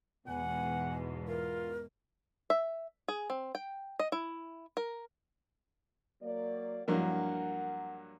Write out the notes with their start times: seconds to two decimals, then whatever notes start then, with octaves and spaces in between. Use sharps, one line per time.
0.28 E2 G#2 B2 F#5 G#5
1.27 F4 A#4
2.50 E5
3.08 G#4
3.30 C4
3.55 G5
4.00 D#5
4.12 E4
4.77 A#4
6.23 F#3 A#3 D5
6.88 G2 F3 F#3 A#3 D4 E4 A#4 F#5